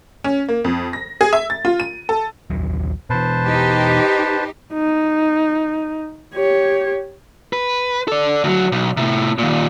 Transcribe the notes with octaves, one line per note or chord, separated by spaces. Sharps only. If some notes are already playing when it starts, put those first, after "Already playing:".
C#4
A#3
F2
A#6
G#4
E5
A6
F4
D#7
A4
A#1 D#2 F#3
B2 E3 B4 C5 A5
D#4 G4
D#4
G4 C#5
B4
A4 D5
D2 F#3
B1
A2 C3
D#2 A#2